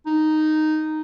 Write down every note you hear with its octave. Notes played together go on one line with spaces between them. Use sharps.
D#4